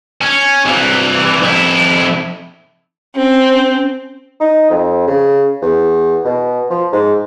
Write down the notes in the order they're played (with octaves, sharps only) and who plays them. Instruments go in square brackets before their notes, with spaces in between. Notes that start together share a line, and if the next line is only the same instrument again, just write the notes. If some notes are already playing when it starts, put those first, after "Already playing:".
[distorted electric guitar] C#4
C2 E3
F2 E4
[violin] C4 [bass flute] C#4
[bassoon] D#4
F2
C#3
E2
B2
F3
G#2